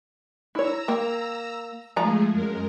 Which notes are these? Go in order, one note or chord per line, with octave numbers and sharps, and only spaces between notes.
E4 C#5 A#5 E6
A#3 G5
F3 G#3 A3 G#4 A#5
F#2 G#3 A#4